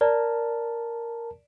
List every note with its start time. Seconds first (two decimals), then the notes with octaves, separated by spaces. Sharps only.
0.01 A#4 D5 A5